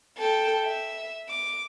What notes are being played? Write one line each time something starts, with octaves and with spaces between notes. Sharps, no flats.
A4 G5
E5
D6